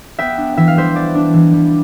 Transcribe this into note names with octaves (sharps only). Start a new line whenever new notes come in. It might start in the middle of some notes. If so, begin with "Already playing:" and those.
B3 E5 G5
D4
E3 E5
F5
G3 C5 E5
B3 D5
D4
E3
G3